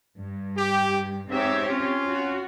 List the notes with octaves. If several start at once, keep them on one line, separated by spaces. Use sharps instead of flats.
G2
G4
G#2 C4 G4 C#5 E5
C#4 F4
F#4